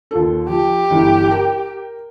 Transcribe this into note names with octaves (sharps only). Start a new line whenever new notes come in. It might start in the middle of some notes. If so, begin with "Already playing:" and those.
D#2 F4 A4
F3 G4
G1 E3
A#4 G5